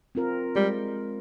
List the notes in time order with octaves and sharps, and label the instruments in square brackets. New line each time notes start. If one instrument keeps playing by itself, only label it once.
[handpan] C4 F4 A#4
[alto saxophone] G3 [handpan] G#3